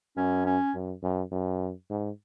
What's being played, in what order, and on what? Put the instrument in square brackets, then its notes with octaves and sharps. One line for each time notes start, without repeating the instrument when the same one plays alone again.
[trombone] F#2 [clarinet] C#4
[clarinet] C#4
[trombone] F#2
F#2
F#2
G#2